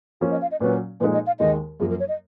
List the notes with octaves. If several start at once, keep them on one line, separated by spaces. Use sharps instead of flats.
F3 A#3 C#4 F4 F#4
D#5
F5
D#5
A#2 F#3 C#4 B4
A#2 F3 G#3 D#4 G#4 B4
D#5
F5
D#2 D#3 G#3 D#5
F#2 F3 A#3 G#4
A#4
C#5
D#5